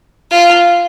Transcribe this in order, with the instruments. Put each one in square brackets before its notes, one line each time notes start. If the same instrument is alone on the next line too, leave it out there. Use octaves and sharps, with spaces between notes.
[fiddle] F4